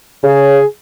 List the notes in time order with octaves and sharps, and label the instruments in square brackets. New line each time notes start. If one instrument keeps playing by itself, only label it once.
[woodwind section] C#3 [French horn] G#4